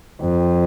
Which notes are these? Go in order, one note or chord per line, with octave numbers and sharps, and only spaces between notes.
F2